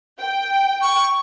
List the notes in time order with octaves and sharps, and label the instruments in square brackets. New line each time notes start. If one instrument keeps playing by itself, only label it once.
[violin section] G5
[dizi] C#6